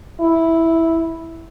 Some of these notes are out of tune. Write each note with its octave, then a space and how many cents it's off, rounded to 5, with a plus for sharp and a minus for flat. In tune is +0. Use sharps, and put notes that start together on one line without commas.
E4 -5